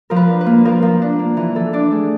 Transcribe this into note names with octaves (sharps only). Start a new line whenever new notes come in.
F3 A#4
B4
D4
B4
A#3
F3 A#4
F3
D4
A#3
E3
E3 A4
D4 D5
A3 G#4